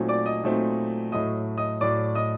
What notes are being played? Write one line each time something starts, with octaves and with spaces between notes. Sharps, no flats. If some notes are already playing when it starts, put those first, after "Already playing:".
Already playing: A#2 F#3 A3 C4 D#4
D5 D6
D#5 D#6
A#2 F#3 A3 C4 D#4
A2 F#3 A3 D#5 D#6
D#5 D#6
A2 F#3 A3 D5 D6
D#5 D#6